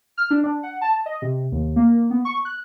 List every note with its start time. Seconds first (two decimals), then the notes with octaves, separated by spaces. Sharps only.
0.18 F6
0.31 D4
0.44 D4
0.63 F#5
0.81 A5
1.06 D#5
1.22 C3
1.52 D#2
1.76 A#3
2.10 B3
2.25 C#6
2.45 F#6